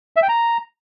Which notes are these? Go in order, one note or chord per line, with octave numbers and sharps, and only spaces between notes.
E5
G5
A#5